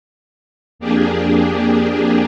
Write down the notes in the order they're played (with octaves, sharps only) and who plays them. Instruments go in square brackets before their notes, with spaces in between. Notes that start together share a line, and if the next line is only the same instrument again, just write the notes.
[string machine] F2 A#3 D4 G4 G#4